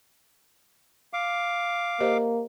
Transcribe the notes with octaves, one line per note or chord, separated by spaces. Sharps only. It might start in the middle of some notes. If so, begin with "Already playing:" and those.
F5 D6
A#3 G4 C5 D#5